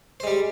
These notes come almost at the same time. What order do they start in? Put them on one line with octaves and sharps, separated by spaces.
C5 G#3 G3